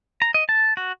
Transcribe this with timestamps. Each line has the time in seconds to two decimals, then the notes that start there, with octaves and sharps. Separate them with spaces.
0.22 A#5
0.34 D#5
0.49 A5
0.77 F#4